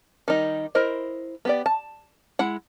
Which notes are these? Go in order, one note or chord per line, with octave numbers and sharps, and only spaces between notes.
D#3 G3 D#4
E4 A#4 C5 D#5
B3 G4 D5
A5
G#3 E4 F#5